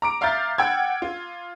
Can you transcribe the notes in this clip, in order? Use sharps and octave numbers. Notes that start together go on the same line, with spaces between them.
A#5 D6 D7
E5 F5 A#5 F6 G6 A6
F#5 G5 E6 G#6
F4